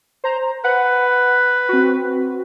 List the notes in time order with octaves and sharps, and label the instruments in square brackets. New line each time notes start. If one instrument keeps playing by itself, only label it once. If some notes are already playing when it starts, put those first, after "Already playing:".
[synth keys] C5 A#5
[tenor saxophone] B4 [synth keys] F#5
[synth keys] C4 F#4